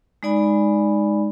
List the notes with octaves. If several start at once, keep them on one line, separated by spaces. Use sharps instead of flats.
G#3 D#4 D5 G#5 B5